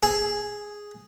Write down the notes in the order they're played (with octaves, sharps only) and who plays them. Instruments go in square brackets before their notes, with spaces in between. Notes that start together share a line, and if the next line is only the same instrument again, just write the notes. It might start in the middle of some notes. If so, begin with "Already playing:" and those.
[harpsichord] G#4